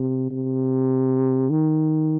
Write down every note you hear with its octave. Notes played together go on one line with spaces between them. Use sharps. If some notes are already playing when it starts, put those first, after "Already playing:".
Already playing: C3
C3
D#3